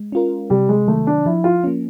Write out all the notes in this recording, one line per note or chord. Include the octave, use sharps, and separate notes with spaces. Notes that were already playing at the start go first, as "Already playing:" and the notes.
Already playing: G#3
C#4 F4 A#4
C3 G3
G#3
D#3 F#3 A3
D4
F3 E4
F4
A#3 C#4